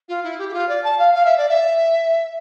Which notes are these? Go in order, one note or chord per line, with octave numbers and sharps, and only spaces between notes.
F4
E4
G4
G4
F4
D5
A5
F5
F5
E5
D5
E5